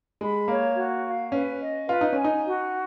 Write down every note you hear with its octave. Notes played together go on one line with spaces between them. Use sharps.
G#3 B5
A#3 C#5
F#4
F5
C#4 B4
D#5
F4 B4
D#4
C#4 G#5
D#4
F#4